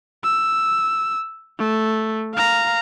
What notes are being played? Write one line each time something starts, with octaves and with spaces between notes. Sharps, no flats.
E6
A3
F5 A#5